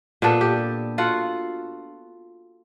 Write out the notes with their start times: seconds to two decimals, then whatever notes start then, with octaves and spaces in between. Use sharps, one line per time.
0.22 A#2 B3 D4 A4
0.41 G4
0.98 F4 F#4 A4 F#5